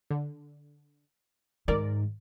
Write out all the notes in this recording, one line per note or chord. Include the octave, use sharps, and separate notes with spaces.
D3
G#2 D#3 A#4 D5